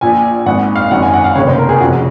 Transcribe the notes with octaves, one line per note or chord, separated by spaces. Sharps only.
A#1 A#2 G#5
G#1 G#2 D#3 F#5
F5
G#1 F#2 D#3 F#5
G#5
F#5
F5
F1 D#2 C#3 C#5
C5
A#4
G#4
F1 F2 C#3 F#4